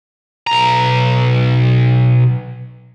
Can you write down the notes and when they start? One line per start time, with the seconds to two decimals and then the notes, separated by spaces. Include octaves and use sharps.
0.47 B1 A#5